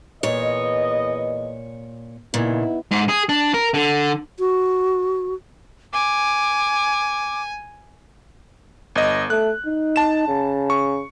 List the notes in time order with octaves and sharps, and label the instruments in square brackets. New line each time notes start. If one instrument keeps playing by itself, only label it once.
[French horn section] E2 B4 D#5 [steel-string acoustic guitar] A#2 C#5
[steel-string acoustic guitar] A#2 C#3 [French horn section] B3 D#4 E4
[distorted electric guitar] G#2
G#4
D4
A#4
D3
[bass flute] F#4
[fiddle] G#5 [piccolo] D6
[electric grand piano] G1 D#5
[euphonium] A3 [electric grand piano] F#6
[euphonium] D#4
[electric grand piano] A5 E7
[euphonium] C#3
[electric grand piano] C#6